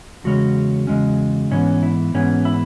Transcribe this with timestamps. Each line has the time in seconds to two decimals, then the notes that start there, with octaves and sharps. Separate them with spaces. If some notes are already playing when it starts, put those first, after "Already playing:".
0.24 E2 C#3 G#3 C#4 F#4
0.87 E2 C#3 G#3 C#4
1.51 G#2 E3 B3 C#4
1.83 E4
2.14 G#2 E3 B3 C#4
2.45 E4